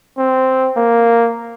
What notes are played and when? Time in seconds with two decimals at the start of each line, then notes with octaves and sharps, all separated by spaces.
0.18 C4
0.77 A#3